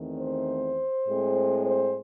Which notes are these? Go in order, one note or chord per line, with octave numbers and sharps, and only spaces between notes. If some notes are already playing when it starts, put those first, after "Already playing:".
Already playing: E2 D#3 A3 C4
C5
A2 G#3 C4
C5